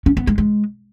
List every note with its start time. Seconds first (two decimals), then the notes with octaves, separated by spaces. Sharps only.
0.06 C#4
0.17 B3
0.27 G#3
0.38 G#3